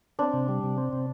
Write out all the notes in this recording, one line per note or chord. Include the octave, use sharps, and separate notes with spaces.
C4 D4
C3
G3
C3
C4
C3